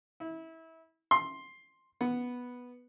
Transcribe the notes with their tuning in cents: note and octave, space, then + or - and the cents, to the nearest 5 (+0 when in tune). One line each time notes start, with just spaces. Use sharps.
E4 -25
C6 +10
B3 -5